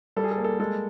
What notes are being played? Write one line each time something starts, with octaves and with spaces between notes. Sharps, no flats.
G3 A4
G#4
A4
A#3
A4
G#3 A4